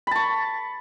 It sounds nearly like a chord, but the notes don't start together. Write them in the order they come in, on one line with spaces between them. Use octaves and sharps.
B5 A5 C#6